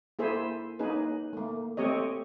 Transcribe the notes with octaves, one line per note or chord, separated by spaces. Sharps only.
A#3 E4 G#4 A4 C5 E5
A#3 C#4 D#4 G#4 B4
A3 A#3
A3 C4 G4 C#5 D#5